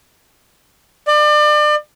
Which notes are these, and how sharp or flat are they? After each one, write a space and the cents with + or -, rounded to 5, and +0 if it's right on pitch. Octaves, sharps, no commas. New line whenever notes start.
D5 +35